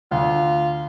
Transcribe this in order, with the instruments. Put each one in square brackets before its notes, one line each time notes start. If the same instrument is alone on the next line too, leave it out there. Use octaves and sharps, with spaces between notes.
[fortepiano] D2 [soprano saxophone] F4